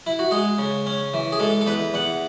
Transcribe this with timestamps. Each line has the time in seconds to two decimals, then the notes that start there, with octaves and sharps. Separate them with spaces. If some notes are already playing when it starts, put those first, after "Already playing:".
0.07 E4
0.19 F#4
0.31 G#3 G#4
0.58 C#3
0.87 C#4
1.14 E3
1.32 G#4
1.40 G#3 A4
1.61 A4
1.67 E2 B4
1.94 E2 F#5